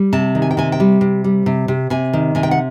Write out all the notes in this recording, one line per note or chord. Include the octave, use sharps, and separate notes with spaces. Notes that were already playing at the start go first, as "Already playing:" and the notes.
Already playing: G3
C3 A5
D#3
G#5
G5
C3 G#5
G5
G3
C3
G3
C3
C3
C3 G#5
D#3
C3 G#5
G5
F#5